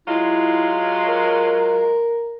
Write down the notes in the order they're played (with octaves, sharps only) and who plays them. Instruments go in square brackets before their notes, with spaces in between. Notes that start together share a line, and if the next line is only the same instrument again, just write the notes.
[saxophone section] F#3 G#3 F4 [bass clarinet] E4
[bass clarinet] A#4